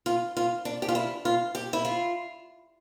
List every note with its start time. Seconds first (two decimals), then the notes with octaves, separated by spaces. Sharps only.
0.06 F4
0.37 F4
0.65 D4
0.82 G4
0.89 F4
0.95 E4
1.25 F4
1.55 G4
1.73 E4
1.85 F4